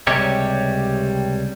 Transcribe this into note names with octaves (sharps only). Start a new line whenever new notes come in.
C#2 C3 G3 G4 C#5